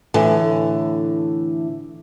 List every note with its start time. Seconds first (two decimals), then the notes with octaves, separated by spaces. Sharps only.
0.14 A2 D3 E3